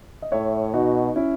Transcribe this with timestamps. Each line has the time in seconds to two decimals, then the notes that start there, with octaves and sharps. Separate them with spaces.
0.22 D#5
0.32 A2 C#5 E5
0.74 B2 D#4 F#4
1.16 C#4 E4